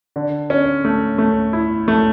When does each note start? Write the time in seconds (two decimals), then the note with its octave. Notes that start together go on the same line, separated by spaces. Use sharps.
0.16 D3
0.50 C#4
0.85 A3
1.18 A3
1.53 E4
1.88 A3